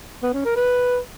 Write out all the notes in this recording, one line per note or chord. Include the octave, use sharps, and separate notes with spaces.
B3
C#4
A#4
B4